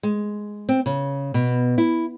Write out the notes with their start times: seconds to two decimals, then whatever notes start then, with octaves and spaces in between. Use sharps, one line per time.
0.03 G#3
0.69 C4
0.86 C#3
1.34 B2
1.78 E4